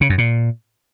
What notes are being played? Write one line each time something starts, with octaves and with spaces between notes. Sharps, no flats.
C#3
F#2
A#2